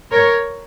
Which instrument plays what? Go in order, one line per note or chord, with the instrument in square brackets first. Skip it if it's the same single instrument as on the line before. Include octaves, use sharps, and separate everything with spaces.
[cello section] A#4 C#5